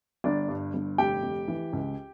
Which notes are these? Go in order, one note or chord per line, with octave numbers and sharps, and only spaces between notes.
G1 D4 D5
G2
G1
F1 G4 G5
F1
E3
C#2